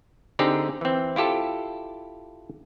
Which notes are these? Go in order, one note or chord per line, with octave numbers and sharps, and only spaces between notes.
D3 C4 D#4 G4 G#4
E3 C4
E4 F4 G4 A4